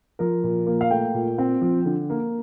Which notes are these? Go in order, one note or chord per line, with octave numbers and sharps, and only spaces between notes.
F3 A#4
A#2
A#3
F5
A3 G5
A#2
C4
F3
D3
A#3